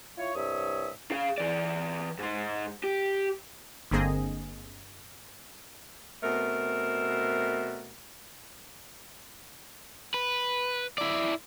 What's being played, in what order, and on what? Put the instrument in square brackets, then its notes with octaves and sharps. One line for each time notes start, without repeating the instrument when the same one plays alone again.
[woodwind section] E4 F4 C#5
C2 G2 C#5 E5 D#6
[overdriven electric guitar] G#4 F5
E3 D5
G#2 C5
G4
[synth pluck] G1 D3 A#3 C4 G#4 D#5
[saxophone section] B2 A3 C4 A#4
[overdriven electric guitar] B4
E4 D5